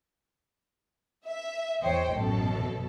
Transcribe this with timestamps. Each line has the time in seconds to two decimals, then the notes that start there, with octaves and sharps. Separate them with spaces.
1.27 E5
1.83 E2 C5 C#5 D#5 G5
2.14 A1 F#2 B2 A4